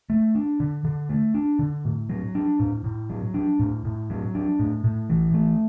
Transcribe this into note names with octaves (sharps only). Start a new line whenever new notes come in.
A3
D4
D3
D3
A3
D4
D3
A2
F#3
D4
A2
A2
F#3
D4
A2
A2
F#3
D4
A2
A2
E3
A3